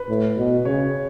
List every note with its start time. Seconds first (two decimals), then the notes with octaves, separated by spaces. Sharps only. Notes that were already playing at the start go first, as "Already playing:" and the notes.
Already playing: B4
0.09 A2
0.37 B2
0.65 C#3 C#5